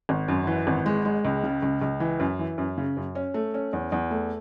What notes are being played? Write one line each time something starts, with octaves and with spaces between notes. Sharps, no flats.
G#1
F#2
E3
G#1
G#3
G#3
C#2
C#3
C#2
C#2
E3
F#2
E3
F#2
C#3
F#2
C#4
A3
C#4
E2
E2
A3